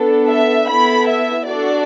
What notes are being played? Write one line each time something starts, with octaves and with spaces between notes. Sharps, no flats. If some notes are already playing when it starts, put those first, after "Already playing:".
Already playing: B3 D4 A4
E5
B3 E4 A4 B5
E5
D4 F#4 A4 D5